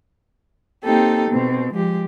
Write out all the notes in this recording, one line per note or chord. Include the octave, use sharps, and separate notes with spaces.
A#3 C4 D#4 G4 A4
B2 C4
F3 G#3 G4